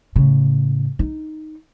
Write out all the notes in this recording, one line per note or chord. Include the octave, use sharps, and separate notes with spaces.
A2 C#3
D#4